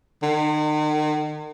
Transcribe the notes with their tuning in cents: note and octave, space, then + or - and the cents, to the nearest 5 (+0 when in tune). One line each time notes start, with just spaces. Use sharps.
D#3 -40